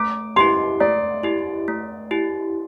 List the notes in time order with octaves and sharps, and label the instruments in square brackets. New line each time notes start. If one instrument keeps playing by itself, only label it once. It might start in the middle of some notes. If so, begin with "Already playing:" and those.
Already playing: [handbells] A3 [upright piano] D6
[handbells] E4 G4 [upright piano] C6
[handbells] A3 [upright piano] D5
[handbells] E4 G4
A3
E4 G4